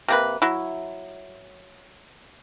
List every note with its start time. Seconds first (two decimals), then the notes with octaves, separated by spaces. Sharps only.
0.08 C3 A#3 B4
0.42 F#3 E4